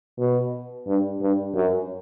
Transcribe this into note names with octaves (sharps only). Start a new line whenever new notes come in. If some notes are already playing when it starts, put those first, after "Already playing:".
B2
G2
G2
F#2